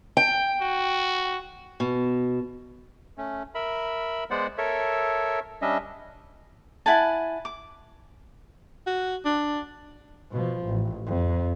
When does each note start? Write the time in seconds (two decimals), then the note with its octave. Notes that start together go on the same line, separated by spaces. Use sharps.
0.17 G5
0.61 F#4
1.80 B2
3.18 A3 C#4
3.55 A#4 E5 B5
4.30 G#3 B3 C5 D5 F#5
4.58 A4 A#4 C#5 E5
5.62 G3 C#4 D4 D#5 E5
6.86 E4 F#5 G#5 A5
7.45 D6
8.87 F#4
9.25 D4
10.32 B2 F3
10.66 A1
11.06 F2